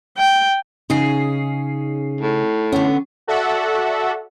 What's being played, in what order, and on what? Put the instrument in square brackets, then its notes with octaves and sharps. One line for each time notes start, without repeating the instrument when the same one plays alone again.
[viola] G5
[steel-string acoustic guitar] C#3 C#4 G#4 [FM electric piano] D#4 C7
[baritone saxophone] A2
[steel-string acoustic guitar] D3 B3 [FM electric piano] C#4
[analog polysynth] F#4 A4 D5 E5 F#5